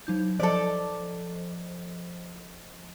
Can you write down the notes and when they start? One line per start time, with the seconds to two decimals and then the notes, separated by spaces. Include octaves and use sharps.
0.07 F#3 D#4 G6
0.40 F3 A4 C5 D5 D#5